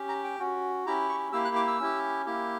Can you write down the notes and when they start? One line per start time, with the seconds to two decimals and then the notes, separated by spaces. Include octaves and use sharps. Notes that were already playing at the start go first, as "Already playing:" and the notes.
Already playing: C#4 G4
0.08 A#5
0.24 G5
0.39 C#4 F#4
0.86 C#4 E4 G4 A#5
1.09 C#6
1.32 A#3 E4 G4 E6
1.45 F#6
1.56 D6
1.67 E6
1.80 C#4 E4 G4
2.26 A#3 E4 G4